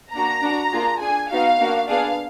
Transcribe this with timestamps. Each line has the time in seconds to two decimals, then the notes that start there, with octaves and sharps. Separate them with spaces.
0.13 A#3 D4 F#4 A#5
0.42 D4 F#4
0.72 A#3 D4 F4 G#4
1.01 D4 G#4 G#5
1.31 B3 D#4 F#4 F5
1.59 A#3 D4 F#4
1.89 B3 D4 G#4 F5